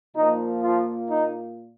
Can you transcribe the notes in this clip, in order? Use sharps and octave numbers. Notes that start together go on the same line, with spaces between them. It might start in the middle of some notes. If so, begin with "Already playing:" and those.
A#2 F3 A#3 D#4
F3 F4
D#4